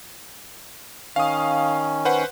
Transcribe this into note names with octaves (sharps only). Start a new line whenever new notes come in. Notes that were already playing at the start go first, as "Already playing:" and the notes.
D#3 C#4 F5 D#6
B4 C5 F#5